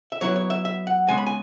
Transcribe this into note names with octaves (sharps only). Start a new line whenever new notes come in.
E5
F#3 B3 E4 C#5
C#5
E5
E5
F#5
C#3 G#3 B3 G#5
B5
G#5